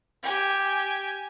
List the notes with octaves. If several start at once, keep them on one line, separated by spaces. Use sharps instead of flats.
G4 G#5